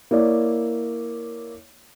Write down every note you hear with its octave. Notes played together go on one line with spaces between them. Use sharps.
A#3 E4 C#5 D5